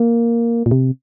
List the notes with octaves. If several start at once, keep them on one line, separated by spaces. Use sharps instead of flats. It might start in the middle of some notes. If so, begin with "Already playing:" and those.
Already playing: A#3
A#2
C3